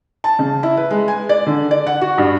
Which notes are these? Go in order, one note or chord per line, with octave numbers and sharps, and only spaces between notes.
A5
C#3
E4
B4
G#3
G#5
D5
D3
D5
F#5
F#4
G2